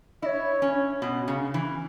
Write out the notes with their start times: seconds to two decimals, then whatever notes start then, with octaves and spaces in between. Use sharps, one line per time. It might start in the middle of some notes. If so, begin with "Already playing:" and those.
0.22 E4 C#5 D#5
0.62 C#4
1.02 B2
1.28 C#3
1.54 E3